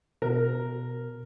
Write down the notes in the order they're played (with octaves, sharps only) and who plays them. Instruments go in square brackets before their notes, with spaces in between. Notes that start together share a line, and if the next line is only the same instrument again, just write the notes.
[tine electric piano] B2 [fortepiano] A#4